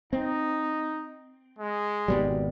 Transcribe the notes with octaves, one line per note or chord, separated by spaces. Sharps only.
C4 D#4
G#3
G#1 B2 G3